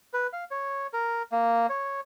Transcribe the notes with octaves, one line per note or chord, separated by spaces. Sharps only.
B4
F5
C#5
A#4
A#3
C#5